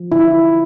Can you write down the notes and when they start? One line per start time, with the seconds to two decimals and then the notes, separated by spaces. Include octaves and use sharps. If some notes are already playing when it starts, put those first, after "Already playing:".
Already playing: F3
0.12 D3 E4